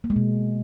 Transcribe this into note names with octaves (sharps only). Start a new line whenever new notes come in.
A#3
G#3
B2